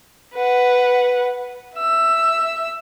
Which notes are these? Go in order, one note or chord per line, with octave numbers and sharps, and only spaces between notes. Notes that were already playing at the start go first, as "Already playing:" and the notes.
B4 F#5
E5 E6